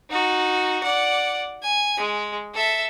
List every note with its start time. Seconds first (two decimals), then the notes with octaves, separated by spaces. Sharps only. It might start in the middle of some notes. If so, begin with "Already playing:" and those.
0.10 D#4 F#4
0.84 D5 F#5
1.63 G#5
1.98 G#3
2.55 A4 E5